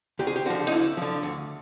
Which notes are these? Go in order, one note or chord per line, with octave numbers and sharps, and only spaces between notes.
D2 G4
G#4
G4
D3 F3 F#4
D#4
D2 E4
D3 F3
D2